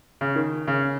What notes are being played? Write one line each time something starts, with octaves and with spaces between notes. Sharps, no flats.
C#3
D#3
C#3